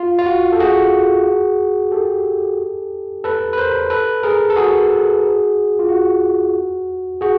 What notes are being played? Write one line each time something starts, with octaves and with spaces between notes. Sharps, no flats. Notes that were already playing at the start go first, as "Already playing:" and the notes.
Already playing: F4
F4
F#4
A4
F#4 G#4
G4 A4
A4 B4
B4
A#4 C5
A4 B4
G#4 A#4
A4
F#4 G#4
F4
F#4
F#4 G#4